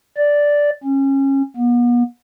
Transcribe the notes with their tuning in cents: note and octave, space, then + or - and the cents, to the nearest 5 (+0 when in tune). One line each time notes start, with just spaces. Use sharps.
D5 -5
C#4 -25
B3 -40